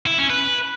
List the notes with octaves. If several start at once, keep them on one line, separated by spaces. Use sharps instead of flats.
E4
C#4
B4